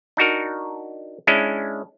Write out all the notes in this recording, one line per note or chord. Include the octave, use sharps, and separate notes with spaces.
D4 D#4 F#4 A#4
G#3 C#4 D4 E4